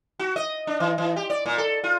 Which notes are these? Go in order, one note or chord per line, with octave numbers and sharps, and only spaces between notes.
F#4
D#5
D4
E3
E3
G4
D5
A#2
A4
F4